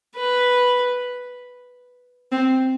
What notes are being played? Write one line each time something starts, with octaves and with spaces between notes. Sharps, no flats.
B4
C4